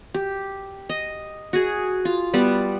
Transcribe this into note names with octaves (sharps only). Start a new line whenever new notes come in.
G4
D#5
F#4 G#4
F4
G3 B3 D5